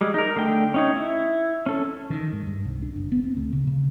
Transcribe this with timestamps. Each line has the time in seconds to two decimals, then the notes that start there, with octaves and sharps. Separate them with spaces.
0.01 G3 G#3
0.14 D#4 A#4
0.36 D3 A3 G5
0.74 C#4 D#4 C#5
0.96 E4
1.66 C#4 A4
2.10 D#3
2.33 G#2
2.47 G2
2.65 C2
2.82 D4
2.96 F#1
3.12 B3
3.23 C4
3.37 D2
3.53 C#3
3.67 C#3